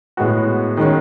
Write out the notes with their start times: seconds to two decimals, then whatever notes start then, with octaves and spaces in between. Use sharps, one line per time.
0.17 A2 G#3 B3 F#4
0.77 D#3 G#3 C#4